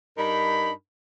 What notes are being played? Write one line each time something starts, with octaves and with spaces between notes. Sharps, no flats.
G2 D4 D#4 A#4 B5